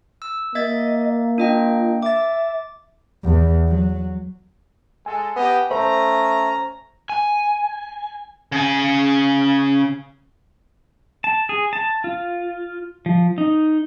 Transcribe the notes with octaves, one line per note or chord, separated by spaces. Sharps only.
E6
A#3 D#5 E5 G#6 A6
D4 F4 D#5 G5
E5 D6 A6
E2
F#3
G#3 A4 G#5
B3 G4 D#5
A3 C#4 C5 A#5
G#5
C#3 G#5
A5
G#4
A5
F4
F3
D#4